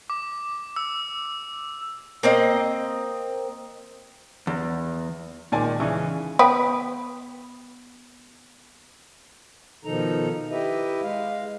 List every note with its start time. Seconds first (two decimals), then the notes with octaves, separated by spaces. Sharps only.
0.10 D6
0.76 E6
2.23 A#3 C4 D#5
4.47 E2
5.52 A#2 D#3 G#3 D5 G#5
5.80 C#3 E3 C#6
6.39 B3 B4 G5
9.85 B2 D#3 F3 D#4 A4 A#5
10.51 E4 G4 B4 D#5 E5
11.03 G#3 F5